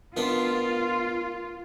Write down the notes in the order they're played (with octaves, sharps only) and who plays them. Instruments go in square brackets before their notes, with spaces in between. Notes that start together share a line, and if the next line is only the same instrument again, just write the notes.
[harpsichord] D#3 B3 D4 [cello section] F4